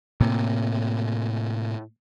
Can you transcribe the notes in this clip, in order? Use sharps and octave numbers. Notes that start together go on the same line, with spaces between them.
A2 C3 A#3